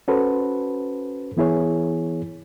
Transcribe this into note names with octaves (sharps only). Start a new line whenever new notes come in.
C#4 F#4 A4 B4 C5
E3 B3 E4 G#4 C#5